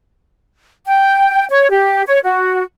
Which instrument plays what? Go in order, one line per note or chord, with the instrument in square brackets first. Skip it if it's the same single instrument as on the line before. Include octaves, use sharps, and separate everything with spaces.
[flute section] G5
C#5
G4
C#5
F#4